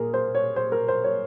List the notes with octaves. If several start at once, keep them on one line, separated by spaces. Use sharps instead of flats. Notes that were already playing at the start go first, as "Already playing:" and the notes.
Already playing: A#2 G#4 A#4
C5
C#5
C5
A#4
C5
C#5